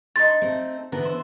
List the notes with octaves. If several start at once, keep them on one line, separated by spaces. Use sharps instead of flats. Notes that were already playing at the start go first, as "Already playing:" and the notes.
D4 D#4 A#4 C6 A6
A3 C4
D3 E3 B3 A#5
C5 E5